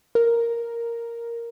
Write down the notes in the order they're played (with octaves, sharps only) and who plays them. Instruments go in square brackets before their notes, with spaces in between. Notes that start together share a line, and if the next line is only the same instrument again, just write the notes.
[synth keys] A#4